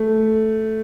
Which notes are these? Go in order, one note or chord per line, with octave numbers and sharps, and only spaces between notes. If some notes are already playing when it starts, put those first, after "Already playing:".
Already playing: A3